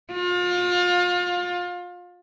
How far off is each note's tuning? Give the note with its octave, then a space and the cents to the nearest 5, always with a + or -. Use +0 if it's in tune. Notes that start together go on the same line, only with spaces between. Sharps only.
F4 +30